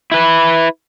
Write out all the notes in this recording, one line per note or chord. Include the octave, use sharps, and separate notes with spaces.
E4 B4